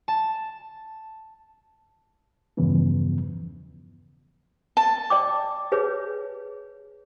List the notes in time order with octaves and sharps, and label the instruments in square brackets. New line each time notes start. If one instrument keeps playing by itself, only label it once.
[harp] A5
[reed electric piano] E2 G2 C#3 E3 F3 B3
[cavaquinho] A5
[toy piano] D5 G5 D6
G#4 B4 C#5